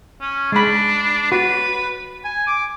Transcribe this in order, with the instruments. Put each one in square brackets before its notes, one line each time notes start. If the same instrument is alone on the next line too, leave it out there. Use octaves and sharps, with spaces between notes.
[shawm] C#4
[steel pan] G#3 B5 [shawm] D4
[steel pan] F#4 [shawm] B4
[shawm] G#5
D6